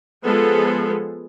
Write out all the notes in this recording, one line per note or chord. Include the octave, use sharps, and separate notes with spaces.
F3 G#3 B3 G#4 A4